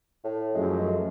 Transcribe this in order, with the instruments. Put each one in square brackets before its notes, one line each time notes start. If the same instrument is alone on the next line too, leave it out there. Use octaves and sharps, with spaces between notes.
[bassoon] A2
[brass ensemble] F#2 F3 A3 [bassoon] G#3